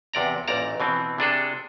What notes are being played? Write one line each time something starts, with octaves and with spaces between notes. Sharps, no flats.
E2 C3 D5 A#5
A1 A#2 D5 A#5
B2 E3 C4
C3 D4 G#4 A4